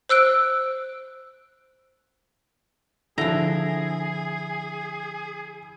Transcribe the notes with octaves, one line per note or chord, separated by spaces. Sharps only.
C5 E6 F#6 D7
D3 F3 E4 G#4 A#5